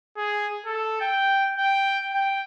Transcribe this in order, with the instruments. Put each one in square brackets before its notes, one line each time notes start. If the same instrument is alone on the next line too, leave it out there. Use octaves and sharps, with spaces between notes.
[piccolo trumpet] G#4
A4
G5
G5
G5